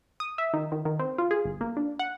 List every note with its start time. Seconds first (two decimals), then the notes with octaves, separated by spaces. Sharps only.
0.20 D#6
0.38 E5
0.54 D#3
0.72 D#3
0.85 D#3
1.00 C4
1.18 F4
1.31 G#4
1.45 G1
1.61 A#3
1.77 D4
1.99 F#5